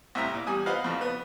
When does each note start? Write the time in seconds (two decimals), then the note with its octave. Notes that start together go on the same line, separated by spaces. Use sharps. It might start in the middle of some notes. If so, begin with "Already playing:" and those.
0.15 C2 A2 E5 A#5
0.34 A#2
0.47 E2 G3 G#5 D#6
0.66 F4 B4 C5 D#5 F5 F#5
0.84 F2 A#2 C#3 F3
1.01 B3